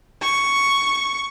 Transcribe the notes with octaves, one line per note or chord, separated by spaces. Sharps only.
C#6